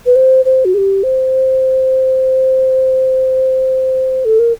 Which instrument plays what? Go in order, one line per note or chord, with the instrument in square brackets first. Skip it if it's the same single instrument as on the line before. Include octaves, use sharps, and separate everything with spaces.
[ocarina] B4
C5
C5
F#4
G#4
G4
C5
A4
A#4